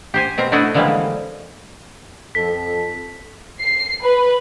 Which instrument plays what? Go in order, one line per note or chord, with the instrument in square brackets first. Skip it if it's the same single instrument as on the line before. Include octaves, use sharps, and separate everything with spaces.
[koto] G4 C5 G#5
B2 C4 A#4 A#5
A3 D4 E4 F#4 D#5 F#5
D3 E3 F3 G3 G#3 A#3
[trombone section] F2 A4 [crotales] B6
[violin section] C7
B4